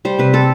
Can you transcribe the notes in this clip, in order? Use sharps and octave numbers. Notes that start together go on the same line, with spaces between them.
G3 C5
C3 B4
C4 A4